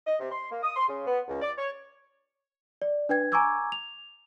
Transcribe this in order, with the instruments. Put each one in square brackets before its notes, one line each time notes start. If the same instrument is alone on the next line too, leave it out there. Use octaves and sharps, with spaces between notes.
[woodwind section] D#5
C3
C6
A#3
D#6
C6
C#3
B3
C#2
D5
C#5
[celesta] D5
D4 B4 G5 G#6
G#5 A#5 C#6 D6 E6 G#6
F7